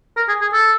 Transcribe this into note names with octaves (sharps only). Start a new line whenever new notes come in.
A#4
G#4
G#4
A4